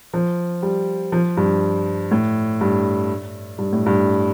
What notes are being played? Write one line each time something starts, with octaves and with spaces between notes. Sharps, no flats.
F3
G3
F3
G2
A2
G2
G2
A2
G2